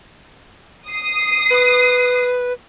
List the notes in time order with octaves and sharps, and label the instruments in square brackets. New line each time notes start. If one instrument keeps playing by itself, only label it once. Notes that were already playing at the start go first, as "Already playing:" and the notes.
[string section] D#6 C7
[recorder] B4